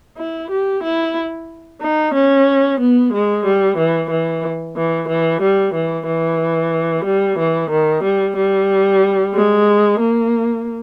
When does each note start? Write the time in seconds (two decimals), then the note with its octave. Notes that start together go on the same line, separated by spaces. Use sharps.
0.17 E4
0.50 G4
0.84 E4
1.81 D#4
2.14 C#4
2.80 B3
3.13 G#3
3.46 G3
3.78 E3
4.11 E3
4.77 E3
5.09 E3
5.42 G3
5.74 E3
6.06 E3
7.05 G3
7.39 E3
7.71 D#3
8.04 G3
8.37 G3
9.34 G#3
10.00 A#3